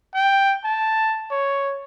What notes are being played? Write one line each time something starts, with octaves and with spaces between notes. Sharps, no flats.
G5
A5
C#5